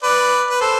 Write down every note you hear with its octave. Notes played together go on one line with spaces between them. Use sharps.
B4 D5
B4
A4 C5